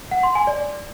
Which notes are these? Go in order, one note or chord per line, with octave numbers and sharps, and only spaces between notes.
F#5
C6
G#5
D5